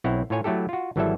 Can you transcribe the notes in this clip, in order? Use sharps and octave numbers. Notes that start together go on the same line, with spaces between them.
B1 C4 E4 C#5 F#5
A2 F4 C#5 G#5
F#3 A3 E4 G4 A4
F4 F#4
G#1 E3 F#3 G3 A4 E5